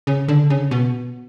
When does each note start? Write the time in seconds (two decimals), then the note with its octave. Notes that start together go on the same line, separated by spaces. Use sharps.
0.07 C#3
0.28 D3
0.50 C#3
0.71 B2